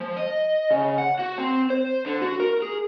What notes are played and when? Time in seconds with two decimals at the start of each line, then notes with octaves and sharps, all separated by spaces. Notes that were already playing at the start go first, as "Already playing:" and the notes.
0.01 F3
0.17 D#5
0.71 C#3
0.98 F#5
1.19 F#4
1.38 C4
1.70 C5
2.06 D3
2.22 F#4
2.40 A#4
2.62 G#4